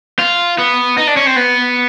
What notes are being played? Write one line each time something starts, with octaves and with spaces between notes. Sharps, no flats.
F4
B3
D#4
D4
C#4
C4
B3